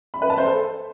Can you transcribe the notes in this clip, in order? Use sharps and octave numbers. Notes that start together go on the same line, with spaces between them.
B5
B4
A5
C5
A4